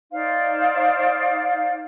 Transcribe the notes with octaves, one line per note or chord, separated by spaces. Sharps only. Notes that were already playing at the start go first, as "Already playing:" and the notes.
D#4 C5 D5 F5